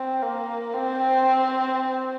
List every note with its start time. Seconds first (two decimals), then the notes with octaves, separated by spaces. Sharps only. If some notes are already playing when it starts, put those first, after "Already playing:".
Already playing: C4
0.23 A#3
0.74 C4